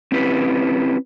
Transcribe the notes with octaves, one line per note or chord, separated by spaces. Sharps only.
C4 C#4 E4 G4 B4